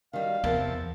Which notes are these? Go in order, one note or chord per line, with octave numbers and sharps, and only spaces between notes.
D#3 G3 F#4 F5
E2 C3 F3 E4 A#4 F#5 A5